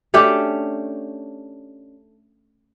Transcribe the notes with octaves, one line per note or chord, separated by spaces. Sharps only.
A3 C#4 D4 G4